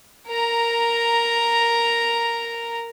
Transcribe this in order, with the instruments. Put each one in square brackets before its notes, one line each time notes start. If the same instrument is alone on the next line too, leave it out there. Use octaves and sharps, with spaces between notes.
[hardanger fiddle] A#4 A#5